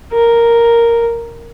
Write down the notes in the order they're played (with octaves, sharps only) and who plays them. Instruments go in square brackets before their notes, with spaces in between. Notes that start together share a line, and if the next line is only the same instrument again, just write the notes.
[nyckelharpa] A#4